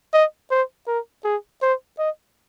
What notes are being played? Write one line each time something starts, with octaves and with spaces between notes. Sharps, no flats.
D#5
C5
A#4
G#4
C5
D#5